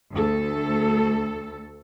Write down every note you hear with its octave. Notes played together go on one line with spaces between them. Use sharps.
D2 A4